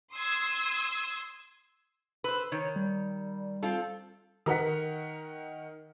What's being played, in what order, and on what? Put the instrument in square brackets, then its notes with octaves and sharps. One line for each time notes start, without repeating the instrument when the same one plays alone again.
[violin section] C6 D#6 E6 G#6
[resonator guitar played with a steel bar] B4 C5 [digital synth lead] E6
[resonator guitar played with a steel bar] D#3 [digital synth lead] C#5
[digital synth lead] G3
[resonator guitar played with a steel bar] C4 F4 A4
[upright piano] D#3 A#4 F#5 B6